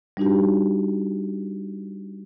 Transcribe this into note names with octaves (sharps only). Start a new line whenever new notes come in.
G3 D4 D#4 F#4 G4